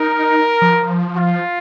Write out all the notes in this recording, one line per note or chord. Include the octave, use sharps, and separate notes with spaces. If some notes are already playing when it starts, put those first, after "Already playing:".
Already playing: D#4 A#4
F3
F4